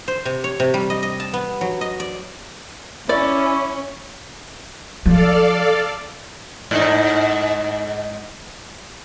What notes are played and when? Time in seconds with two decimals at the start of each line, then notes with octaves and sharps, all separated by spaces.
0.08 C5
0.25 C3
0.44 C#5
0.60 C3
0.74 G3
0.90 D#5
1.03 D#5
1.20 A5
1.33 B3
1.61 F#3
1.81 D#5
2.00 D5
3.09 C#4 E4 D5
5.06 F3 A4 D5 F5
6.71 G#2 D#4